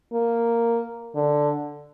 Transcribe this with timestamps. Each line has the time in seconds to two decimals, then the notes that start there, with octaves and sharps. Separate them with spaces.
0.13 A#3
1.15 D3